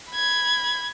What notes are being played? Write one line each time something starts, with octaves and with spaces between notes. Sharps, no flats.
B5 G#6